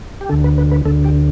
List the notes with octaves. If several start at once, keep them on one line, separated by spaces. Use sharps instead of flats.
G4
D2 D3 A4
B4
B4
B4
D2 D3 A4
G4